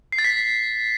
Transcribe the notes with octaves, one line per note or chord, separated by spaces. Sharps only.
C7
A6
B6